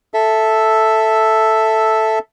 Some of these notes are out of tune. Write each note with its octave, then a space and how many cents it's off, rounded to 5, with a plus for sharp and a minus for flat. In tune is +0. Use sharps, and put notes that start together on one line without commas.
A4 +0 E5 +0